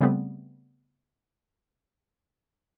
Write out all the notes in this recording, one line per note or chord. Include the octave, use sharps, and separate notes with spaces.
C#3 G3 A3 B3 C4